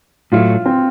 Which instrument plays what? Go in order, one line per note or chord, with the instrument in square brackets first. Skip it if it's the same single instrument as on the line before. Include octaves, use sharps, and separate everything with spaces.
[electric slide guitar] A2 F#3 A3 [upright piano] F4
[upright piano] C4